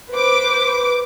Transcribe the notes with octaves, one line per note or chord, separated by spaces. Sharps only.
B4 C5 D6